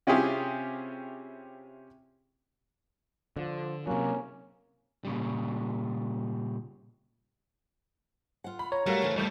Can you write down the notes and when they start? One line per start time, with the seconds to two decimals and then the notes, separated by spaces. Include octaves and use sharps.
0.07 C3 C#4 E4 F4 G4 G#4
3.36 D3 F3
3.87 C3 F#3 A#3 C#4
5.05 A#2 C#3 G3
8.44 F4 F#5
8.59 B5
8.72 C#5 A#5
8.86 G3 A3 F#4 A#4 F5
9.02 D2 C#3 E3
9.16 F2 G3 A3 G6